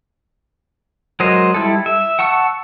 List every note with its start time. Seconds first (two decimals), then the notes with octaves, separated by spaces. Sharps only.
1.20 F#3 G#3 A#4 C5 D#5
1.54 G3 E4 A4
1.86 E5
2.19 F#5 A5 C#6 E6